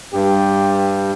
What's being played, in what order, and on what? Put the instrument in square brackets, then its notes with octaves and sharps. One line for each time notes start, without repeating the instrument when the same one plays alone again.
[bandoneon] G2 [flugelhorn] G4